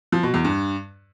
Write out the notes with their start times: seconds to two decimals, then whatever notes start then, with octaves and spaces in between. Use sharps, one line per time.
0.12 F3
0.23 B2
0.34 E2
0.45 G2